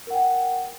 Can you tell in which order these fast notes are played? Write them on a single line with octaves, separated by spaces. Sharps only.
A#4 F#5 G5